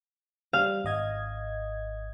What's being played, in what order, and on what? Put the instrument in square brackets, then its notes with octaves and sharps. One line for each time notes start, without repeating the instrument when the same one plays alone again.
[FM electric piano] G3 [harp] F5
[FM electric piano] G#1 D#5 G#6